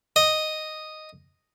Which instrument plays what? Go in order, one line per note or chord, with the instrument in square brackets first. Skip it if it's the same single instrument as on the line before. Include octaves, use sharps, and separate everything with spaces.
[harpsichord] D#5